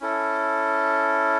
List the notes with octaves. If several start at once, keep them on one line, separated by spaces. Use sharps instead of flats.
C#4 E4 A4